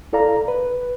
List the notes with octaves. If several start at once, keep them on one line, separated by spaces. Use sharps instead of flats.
E4 A4 D5 F5 A#5
B4